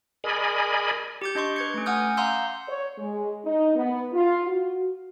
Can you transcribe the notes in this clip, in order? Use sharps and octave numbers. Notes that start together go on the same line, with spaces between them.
G#4 A#4 D5 D#5 G#5 B5
G4 D6 G6
D4 D#5 C6 C#6
B4 G#6 C#7
A3 C#4
F#5 G#5 D6 D#6 F6 G6
F5 F#5 A#5 C6 E6 G6
C#5
G#3
D#4
B3
F4
F#4